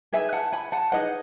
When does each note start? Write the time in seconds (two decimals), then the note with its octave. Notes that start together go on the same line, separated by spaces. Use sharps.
0.13 D#4 G#4 B4 E5 G#5
0.33 F#5 A5
0.53 G#5 B5
0.72 F#5 A5
0.92 D#4 G#4 B4 D#5 F#5